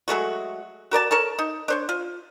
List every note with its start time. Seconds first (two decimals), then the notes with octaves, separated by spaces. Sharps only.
0.08 F#3 G#3 A3 F#4
0.91 F#4 A#4 D5 A5
1.11 A4 A#4 C#5 A5
1.39 D#4
1.68 D4 C5 C#5
1.89 F4